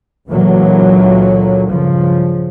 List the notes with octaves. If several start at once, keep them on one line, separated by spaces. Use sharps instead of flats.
C#2 A#2 D3 E3 F#3 A#3
G2 C#3 F3